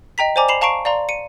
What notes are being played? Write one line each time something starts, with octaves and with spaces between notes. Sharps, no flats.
D#5 G5 A#5 B6
C5 D5 G#5 A#5 D6
B5 C7 E7 F7
F5 A5 A#5 C#6 C7 D7
D5 F5 A#5 C6
C#7 D#7